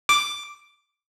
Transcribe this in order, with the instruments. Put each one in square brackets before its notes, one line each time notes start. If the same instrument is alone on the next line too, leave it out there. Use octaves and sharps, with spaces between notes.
[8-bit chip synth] D6